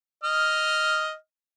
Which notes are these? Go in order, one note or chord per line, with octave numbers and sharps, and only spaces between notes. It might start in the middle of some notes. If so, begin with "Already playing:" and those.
D#5 F6